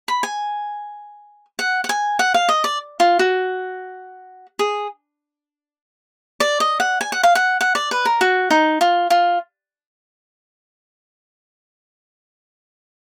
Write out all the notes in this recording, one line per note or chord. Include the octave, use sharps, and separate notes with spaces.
B5
G#5
F#5
F#5
G#5
F#5
F5
D#5
D5
F4
F#4
G#4
D5
D#5
F#5
G#5
F#5
F5
F#5
F#5
D5
B4
A#4
F#4
D#4
F4
F4